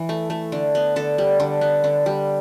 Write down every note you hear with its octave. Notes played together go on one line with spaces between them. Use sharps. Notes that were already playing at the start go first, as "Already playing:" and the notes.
Already playing: E3
A3
A3
D3
B3
D3 A4
G3
D3
B3
D3
G3